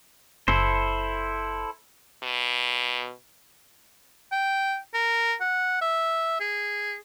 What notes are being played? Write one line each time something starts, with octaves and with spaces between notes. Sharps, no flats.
F#1 E4 A4 C5
B2
G5
A#4
F#5
E5
G#4